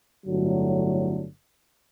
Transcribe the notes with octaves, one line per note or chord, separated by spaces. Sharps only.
G1 A2 D3 F#3